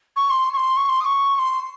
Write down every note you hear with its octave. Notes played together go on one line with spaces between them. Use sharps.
C#6
C6
C#6
C6
C#6
C6
D#6
C#6
C#6
C6